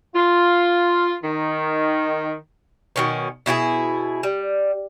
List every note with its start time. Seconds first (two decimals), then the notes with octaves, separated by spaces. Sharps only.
0.16 F4
1.24 D#3
2.96 B2 D#3 C#4
3.46 B2 E4 F#4 G#4
4.23 G3